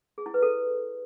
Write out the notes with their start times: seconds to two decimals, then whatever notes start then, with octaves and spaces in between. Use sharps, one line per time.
0.18 G#4
0.26 E4
0.34 B4
0.42 A4